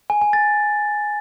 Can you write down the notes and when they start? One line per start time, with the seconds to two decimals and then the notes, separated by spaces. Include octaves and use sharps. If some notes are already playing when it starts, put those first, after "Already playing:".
0.10 G#5
0.21 G#5
0.33 A6